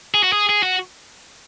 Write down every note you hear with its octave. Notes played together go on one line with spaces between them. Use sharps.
G#4
F#4
G#4
G#4
F#4